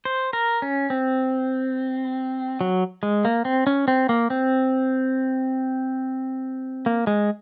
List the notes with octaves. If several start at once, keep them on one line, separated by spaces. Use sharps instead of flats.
C5
A#4
C#4
C4
F#3
G#3
A#3
C4
C#4
C4
A#3
C4
A#3
G#3